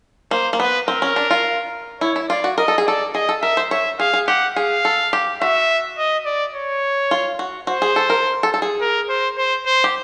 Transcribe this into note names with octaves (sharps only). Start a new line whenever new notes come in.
A#3 C5
A#3
B3 B4
C4 A#4
C#4
D4
F4
E4 C#5
E4
F4 D5
F#4
A#4 D#5
A4
G#4
A4 D5
G#4 D#5
A4
A#4 E5
C5
C#5 E5
G#4 F5
G#4
G4 F#5
G#4 F5
A4
G4
F#4 E5
D#5
D5
C#5
F4
F#4
F#4 C5
G#4
A4
A#4
A4
A4
G#4
A#4
C5
C5
C5
G4